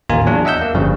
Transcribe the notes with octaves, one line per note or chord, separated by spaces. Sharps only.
A1 D#2 A#3 F4 G#5 A#5
E2 F#3 D4
D#5 E5 F#5 E6 G6
A#3
G1 G2 C#3 F3 G3